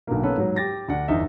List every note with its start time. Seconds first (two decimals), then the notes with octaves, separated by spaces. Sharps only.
0.07 B1 B2 D3 A#3
0.23 A#3 B3 C#4 A4 B4
0.38 G#2 F#3
0.56 G4 A6 A#6
0.88 D2 D4 D5 F#5
1.08 G1 E2 D#4 E5